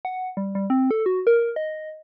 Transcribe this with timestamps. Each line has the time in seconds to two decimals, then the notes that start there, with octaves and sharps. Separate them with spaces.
0.05 F#5
0.37 G3
0.55 G3
0.70 C4
0.91 A4
1.06 F#4
1.27 A#4
1.56 D#5